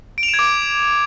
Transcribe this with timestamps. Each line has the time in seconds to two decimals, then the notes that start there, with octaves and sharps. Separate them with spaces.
0.18 D7
0.23 F7
0.28 E7
0.34 G#6
0.39 D6